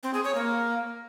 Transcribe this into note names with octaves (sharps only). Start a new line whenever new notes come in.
C4
G#4
C#5
A#3